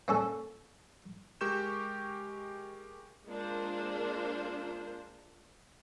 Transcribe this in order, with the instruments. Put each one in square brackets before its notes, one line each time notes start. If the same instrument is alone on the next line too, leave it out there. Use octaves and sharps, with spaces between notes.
[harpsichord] A#3 C#4 A4
[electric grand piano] G#3 G4 A#4 C#6 G6 E7
[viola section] G#3 A#3 D4 F4 A#4 C5